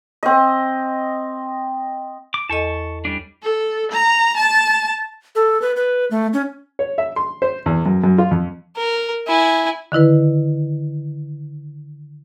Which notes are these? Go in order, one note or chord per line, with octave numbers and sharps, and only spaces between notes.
C4 D#5
D6
E2 A4 D#5 A5 C#6
G3 C#4 D4
A4
A#5
A5
A4
B4
B4
A3
C#4
C#5
E5
C6
C5
E2
F#2
F#2
F4
F2
A#4
E4 G#5
D3 D#3 E4 B4